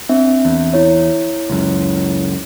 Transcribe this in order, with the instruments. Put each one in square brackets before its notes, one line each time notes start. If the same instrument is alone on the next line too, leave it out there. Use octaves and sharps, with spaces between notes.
[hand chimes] C4 D4 E5
[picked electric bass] E2
[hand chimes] E4 C#5
[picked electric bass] C#2 F#2